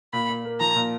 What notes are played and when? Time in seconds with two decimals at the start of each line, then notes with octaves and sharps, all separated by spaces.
0.13 A#2 B5
0.29 A#2
0.45 A#3
0.60 F3 A#5
0.76 A#2